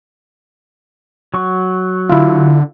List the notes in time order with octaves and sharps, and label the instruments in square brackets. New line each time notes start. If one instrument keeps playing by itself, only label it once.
[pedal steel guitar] F#3 C#6
[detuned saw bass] D3 [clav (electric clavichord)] E4 F4